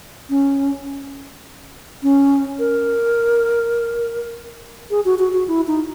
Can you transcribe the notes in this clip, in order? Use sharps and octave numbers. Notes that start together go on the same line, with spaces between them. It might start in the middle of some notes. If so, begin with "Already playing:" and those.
C#4
C#4
A#4
G#4
F#4
F#4
F#4
E4
D#4